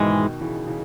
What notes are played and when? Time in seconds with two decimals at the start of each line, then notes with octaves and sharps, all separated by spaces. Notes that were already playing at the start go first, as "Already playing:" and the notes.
Already playing: G#2 B2 D#3 E3 G#3
0.41 C#3 E3
0.67 C#3 E3